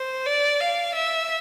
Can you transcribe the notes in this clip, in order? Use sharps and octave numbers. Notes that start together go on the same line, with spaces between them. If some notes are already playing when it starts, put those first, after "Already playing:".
Already playing: C5
D5
F5
E5